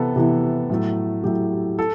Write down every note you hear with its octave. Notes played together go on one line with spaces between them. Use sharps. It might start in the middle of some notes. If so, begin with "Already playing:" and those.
Already playing: C3 E3 B3 A4
C3 E3 B3
A2 F#3 A3
A2 F#3 A3 G4
A4